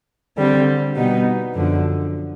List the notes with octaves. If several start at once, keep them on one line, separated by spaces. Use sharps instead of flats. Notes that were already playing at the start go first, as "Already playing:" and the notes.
D3 G3 C4
B2 G3 B3 D#4
F#2 D3 F3